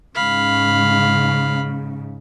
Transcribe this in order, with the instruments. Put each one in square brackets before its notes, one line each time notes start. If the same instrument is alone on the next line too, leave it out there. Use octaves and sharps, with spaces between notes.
[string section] G#2 C#3 [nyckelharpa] F5 B5